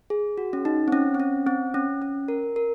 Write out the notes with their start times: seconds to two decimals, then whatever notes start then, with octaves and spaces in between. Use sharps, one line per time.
0.10 G#4
0.38 F#4
0.53 C#4
0.65 D#4
0.88 C4
0.92 C#4
1.14 C4
1.20 C#4
1.47 C4
1.74 C#4
2.02 C#4
2.28 A#4
2.56 A#4